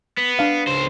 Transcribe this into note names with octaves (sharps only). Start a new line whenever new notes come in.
B3
D4 F5
C#2 C5